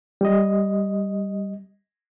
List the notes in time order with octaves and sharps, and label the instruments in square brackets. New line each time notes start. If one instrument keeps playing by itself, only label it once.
[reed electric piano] G3 D#5